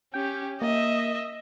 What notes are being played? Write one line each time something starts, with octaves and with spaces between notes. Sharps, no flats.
C#4 G4 G5
A#3 D#5 E5